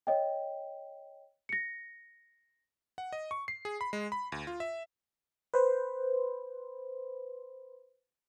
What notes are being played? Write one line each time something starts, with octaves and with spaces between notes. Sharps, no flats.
C#5 D#5 G5
A#6 C#7
F#5
D#5
C#6
C7
G#4
B5
G#3
B5
D2
F4
E5
B4 C5